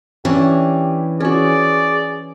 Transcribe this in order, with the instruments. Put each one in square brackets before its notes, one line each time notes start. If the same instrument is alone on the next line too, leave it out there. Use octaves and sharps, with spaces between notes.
[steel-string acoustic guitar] E3 [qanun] C#4 D4 [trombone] G4
[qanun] C#4 F#4 [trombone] G#4 [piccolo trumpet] D5